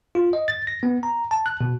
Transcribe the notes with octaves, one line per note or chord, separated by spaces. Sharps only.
F4
D#5
A6
A#6
B3
A#5
A5
F#6
B2